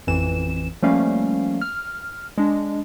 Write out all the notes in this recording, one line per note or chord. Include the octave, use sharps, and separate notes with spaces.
A1 F2 E3 E7
F3 G3 A3 A#3 C#4 F5
F6
G#3 D4